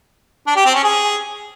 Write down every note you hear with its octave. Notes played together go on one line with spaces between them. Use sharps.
D4
G4
C4
C#4
G#4